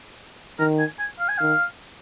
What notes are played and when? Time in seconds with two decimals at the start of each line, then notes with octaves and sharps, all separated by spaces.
0.59 D#3 A#4
0.79 G#5
0.99 G#5
1.20 F5
1.29 G#5
1.38 D#3 F5